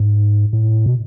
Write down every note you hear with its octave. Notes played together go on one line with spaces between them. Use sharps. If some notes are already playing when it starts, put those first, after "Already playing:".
Already playing: G#2
A2
B2